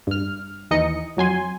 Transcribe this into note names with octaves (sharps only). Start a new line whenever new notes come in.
G2 F6
D#2 E3 D#4 D#5 C#7
F2 F#3 G#5 C6